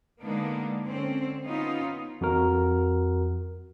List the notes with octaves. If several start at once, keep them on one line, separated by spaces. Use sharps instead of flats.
D3 G#3 A#3 B3 D4 D#4
D3 C4 C#4
B3 C#4 D#4 F4
F2 F#4 A#4